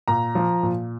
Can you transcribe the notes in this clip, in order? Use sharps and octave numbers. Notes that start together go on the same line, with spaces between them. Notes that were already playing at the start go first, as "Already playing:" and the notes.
A#2 A#5
F3
A#2